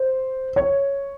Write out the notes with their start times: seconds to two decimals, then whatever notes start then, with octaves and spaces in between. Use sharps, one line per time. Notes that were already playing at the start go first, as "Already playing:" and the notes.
Already playing: C5
0.56 C#5